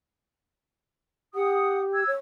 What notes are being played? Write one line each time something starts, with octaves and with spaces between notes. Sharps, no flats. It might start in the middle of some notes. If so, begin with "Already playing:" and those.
G4 F#5 D#6
E6 G#6
C#5